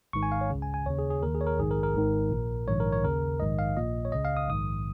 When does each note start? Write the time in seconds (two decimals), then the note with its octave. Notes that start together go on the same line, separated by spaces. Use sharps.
0.13 G#1 G#2 D#3 C#6
0.23 G#5
0.32 F5
0.41 C#5
0.50 C#2 C#3
0.62 G#5
0.74 G#5
0.86 D#2 C#3 C#5
0.99 G#4
1.10 G#4
1.23 D#2 D#3 A#4
1.35 G#4
1.41 C#5
1.47 A#4
1.58 A#1 G#2 D#3 G#4
1.71 A#4
1.83 A#4
1.95 G#1 G#2 D#3
2.31 A#1 A#2
2.68 A#1 G#2 D#3 C#5
2.80 A#4
2.92 C#5
3.04 D#2 C#3 A#4
3.40 A#1 G#2 D#3 D#5
3.59 F5
3.77 A#1 A#2 D#5
4.05 C#5
4.12 C#2 C#3 D#5
4.25 F5
4.37 D#6
4.49 A#1 G#2 D#3 D#6